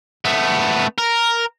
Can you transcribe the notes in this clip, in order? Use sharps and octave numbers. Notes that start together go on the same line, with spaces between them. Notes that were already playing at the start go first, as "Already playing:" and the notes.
A3 B3
A#4